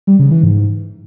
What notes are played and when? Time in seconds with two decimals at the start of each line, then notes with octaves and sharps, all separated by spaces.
0.07 G3
0.19 C#3
0.31 E3
0.43 G#2